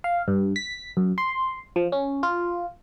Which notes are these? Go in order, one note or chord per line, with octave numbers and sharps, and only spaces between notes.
F5
G2
B6
F#2
C6
F3
C#4
F4